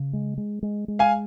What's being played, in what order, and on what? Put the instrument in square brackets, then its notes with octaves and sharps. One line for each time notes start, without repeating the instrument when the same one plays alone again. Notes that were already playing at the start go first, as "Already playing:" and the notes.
Already playing: [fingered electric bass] C#3
G#3
G#3
G#3
G#3
[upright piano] F5 G#5